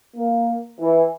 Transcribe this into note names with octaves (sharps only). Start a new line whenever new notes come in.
A#3
E3